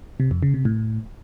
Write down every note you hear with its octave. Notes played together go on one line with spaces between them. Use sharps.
C3
F2
C#3
C3
A2